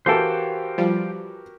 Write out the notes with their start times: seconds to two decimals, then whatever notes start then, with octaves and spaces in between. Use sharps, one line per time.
0.06 E3 F#4 G4 A4 A#4 C5 F5 G5
0.78 F3 G3